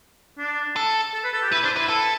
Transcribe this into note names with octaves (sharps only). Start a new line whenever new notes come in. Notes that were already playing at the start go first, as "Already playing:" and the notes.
D4
A4
A4
B4
A4
G4
E4 B4
D4 C5
E4 B4
A4